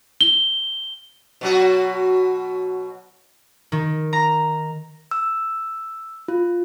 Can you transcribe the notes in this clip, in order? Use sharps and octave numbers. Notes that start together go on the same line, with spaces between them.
G7
B2 F#3 F#4
D#3
A#5
E6
F4